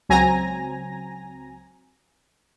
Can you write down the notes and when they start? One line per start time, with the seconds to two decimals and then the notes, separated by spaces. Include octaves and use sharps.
0.09 C#2 F#3 C4 G#5 A#5 A#6